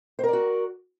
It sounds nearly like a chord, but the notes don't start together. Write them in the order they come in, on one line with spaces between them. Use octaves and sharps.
C5 A#4 D5 F#4